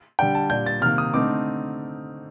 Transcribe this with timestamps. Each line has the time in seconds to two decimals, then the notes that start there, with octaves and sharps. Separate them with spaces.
0.19 D3 G3 D4 G5
0.35 A5
0.50 A#2 G3 D4 G6
0.66 A6
0.81 C3 D#3 A#3 F6
0.98 D#6
1.14 D3 A3 C4 D#4 D6